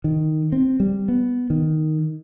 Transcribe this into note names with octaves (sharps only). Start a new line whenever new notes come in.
D#3
C4
G3
B3
D#3